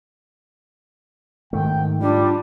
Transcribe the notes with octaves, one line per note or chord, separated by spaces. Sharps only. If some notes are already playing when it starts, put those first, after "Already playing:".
G#2 D#3 A3 G5
G3 D4 F4